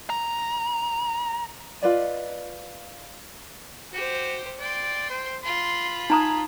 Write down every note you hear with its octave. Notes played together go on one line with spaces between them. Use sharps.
A#5
F4 B4 D5 D#5
F#4 G4 C5
D5 G5 C6
C5
F4 B5 C6
D#4 G#5 A#5 D#6